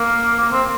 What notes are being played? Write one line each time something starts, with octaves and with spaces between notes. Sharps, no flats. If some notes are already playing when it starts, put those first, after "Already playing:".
Already playing: A#3
A#3
C4